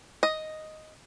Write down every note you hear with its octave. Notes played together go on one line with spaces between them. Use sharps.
D#5